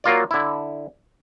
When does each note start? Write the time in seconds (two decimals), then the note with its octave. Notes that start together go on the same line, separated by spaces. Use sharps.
0.04 F#3 A#3 F4 D5
0.31 D3 E4